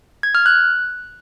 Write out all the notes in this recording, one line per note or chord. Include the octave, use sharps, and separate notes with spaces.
G#6
F6
F#6